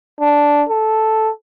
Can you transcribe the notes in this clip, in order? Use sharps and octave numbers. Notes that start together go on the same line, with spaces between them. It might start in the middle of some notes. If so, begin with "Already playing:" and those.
D4
A4